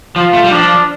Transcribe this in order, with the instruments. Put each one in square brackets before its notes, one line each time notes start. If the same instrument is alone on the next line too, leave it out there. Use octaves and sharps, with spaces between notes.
[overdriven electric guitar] F3 [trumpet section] F4
[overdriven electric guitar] A3
G3
[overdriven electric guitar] F3 [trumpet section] D4